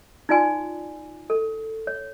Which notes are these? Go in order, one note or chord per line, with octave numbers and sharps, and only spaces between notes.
D#4 F4 D5 G#5 C6
A4
C#5